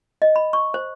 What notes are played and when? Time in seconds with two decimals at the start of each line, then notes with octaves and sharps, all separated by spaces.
0.22 D#5
0.36 B5
0.53 C#6
0.74 C5